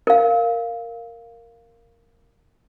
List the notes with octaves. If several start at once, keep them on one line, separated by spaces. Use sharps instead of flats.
A#4 F5